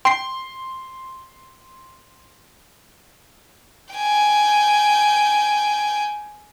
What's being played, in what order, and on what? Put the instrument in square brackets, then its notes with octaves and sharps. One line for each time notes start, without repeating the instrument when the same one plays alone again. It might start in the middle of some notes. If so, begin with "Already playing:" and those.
[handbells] G5 C7 [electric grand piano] C6
[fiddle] G5 G#5